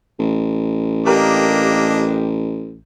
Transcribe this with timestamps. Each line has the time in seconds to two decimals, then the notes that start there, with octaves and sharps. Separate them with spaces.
0.19 A1
1.06 A#3 D4 G4 A#4 D#5